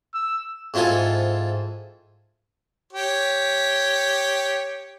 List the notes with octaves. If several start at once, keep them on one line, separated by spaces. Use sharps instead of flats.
E6
G#2 C4 E4 F4 A4 G#5
G4 C#5